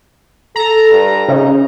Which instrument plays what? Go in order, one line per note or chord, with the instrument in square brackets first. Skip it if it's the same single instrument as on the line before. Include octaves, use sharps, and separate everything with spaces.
[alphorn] A4 [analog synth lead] A#5
[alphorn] G2
[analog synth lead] C#3 [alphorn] D#4